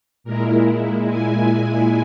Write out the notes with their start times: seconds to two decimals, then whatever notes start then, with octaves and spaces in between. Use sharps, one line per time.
0.24 A#2 G#3 E4 A#4
1.08 G#5